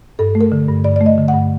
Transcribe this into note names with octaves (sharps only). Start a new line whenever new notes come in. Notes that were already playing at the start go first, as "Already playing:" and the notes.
G2 A4
A3
A#4
D3
G2
G2 D5
D5
A3
D#5
D3
G2 F#5